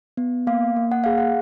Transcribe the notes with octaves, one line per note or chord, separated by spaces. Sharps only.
B3
A#3 F5
A#3
F#5
G#4 F5
F#5